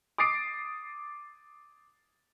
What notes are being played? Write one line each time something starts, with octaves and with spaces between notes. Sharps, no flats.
D6 D#6 A6 C7 D7